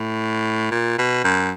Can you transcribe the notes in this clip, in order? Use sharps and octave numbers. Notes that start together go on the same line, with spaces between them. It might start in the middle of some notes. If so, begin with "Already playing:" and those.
Already playing: A2
A#2
B2
F#2